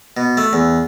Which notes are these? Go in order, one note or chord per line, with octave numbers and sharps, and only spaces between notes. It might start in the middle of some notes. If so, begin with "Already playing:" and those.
B2
A3
E2